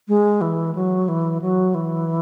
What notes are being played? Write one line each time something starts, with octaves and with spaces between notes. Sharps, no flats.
G#3
E3
F#3
E3
F#3
E3